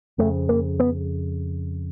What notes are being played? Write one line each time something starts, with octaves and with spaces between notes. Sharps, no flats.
F2 C#3 A3
A#3
B3